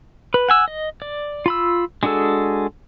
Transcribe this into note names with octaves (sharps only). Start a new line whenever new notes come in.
B4
F#5 G#5 E6
D#5
D5
F4 B5 E6
G#3 D4 F#4 G#4 A4